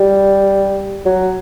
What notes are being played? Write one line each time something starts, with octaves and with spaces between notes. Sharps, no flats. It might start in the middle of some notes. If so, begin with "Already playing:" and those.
Already playing: G3
F#3